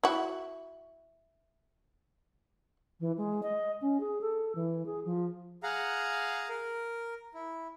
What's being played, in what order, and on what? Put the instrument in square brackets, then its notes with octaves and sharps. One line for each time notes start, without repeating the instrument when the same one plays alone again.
[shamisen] E4 F#4
[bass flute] E3
G#3
D#5
C#4
G#4
A4
E3
G#4
F3
[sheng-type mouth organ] G#4 F5 F#5 A#5
A#4
E4